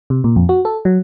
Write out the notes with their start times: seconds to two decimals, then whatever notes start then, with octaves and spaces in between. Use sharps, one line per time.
0.10 C3
0.24 A#2
0.36 F2
0.49 F#4
0.65 A4
0.85 F#3